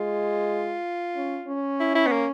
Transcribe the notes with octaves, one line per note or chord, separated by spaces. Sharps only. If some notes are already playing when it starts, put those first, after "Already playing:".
Already playing: G#3 F4
C#4
C#4
E4
E4
B3
A#3